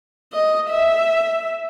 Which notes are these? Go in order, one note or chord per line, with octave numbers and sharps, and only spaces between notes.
D#5
E5